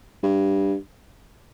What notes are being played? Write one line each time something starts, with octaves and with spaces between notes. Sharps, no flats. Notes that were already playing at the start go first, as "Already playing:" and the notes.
G2